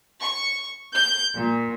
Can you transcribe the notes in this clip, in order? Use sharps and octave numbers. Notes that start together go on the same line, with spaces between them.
C#6
G6
A#2